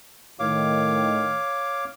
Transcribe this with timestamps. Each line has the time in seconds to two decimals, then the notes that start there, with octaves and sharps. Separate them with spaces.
0.39 A2 D#3 C#5 F5 D6